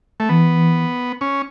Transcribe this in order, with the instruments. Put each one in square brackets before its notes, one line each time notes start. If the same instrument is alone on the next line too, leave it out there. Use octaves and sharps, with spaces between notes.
[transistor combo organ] A3
[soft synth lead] E3 [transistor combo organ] B3
[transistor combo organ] C#4